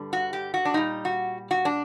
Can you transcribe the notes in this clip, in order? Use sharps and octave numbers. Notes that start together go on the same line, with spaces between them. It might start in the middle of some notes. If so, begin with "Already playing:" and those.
Already playing: G2 D3 G3
F#4
G4
F#4
D4
A#2 G3 D#4
F#4
F#4
D4